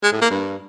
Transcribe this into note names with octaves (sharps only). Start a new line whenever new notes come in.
G#3
A2
A#3
G2